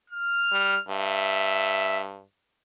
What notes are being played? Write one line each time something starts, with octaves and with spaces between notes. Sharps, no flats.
F6
G3
G2 E5